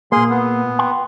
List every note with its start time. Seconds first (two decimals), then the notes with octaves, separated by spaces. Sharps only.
0.12 A#2 A#3 G#4 C6
0.30 B3
0.79 G5 C6